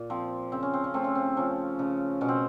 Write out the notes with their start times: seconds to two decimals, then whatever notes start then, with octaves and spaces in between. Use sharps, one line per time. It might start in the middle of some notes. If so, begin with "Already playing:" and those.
Already playing: A#2
0.10 F3 C4
0.52 C#3 C4
0.63 C#4
0.73 C4
0.84 C#4
0.94 A3 C4
1.04 C#4
1.15 C4
1.37 F3 C#4
1.79 C#3
2.21 B2 C#4
2.29 C4